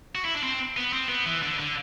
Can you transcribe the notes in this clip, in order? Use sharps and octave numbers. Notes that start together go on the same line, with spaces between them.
F#4
E4
D4
C4
B3
C4
B3
E3
D3
D3